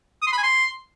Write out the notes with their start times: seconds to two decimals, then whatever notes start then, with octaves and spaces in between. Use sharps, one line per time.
0.22 D#6
0.27 C6
0.33 B5
0.38 G#5
0.43 C6